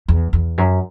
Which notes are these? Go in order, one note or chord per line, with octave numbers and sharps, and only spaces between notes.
E2
E2
F#2